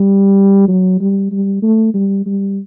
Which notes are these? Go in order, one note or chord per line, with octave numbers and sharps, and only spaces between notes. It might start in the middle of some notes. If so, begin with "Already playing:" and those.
Already playing: G3
F#3
G3
G3
A3
G3
G3